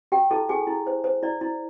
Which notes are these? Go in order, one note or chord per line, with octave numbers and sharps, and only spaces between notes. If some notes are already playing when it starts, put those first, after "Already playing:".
G4 G5
E4 A4 A5
G4 G#4 G#5
E4
C5
C5
E4 D5
E4